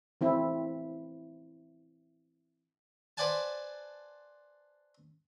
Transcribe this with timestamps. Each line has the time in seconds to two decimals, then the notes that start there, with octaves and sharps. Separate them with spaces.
0.21 E3 C4 E4
3.17 B4 C5 D5 F#5 G#5 A5